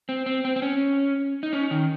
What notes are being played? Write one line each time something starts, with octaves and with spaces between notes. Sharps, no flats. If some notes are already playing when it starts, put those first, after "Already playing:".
C4
C4
C4
C4
C#4
D#4
C#4
D#3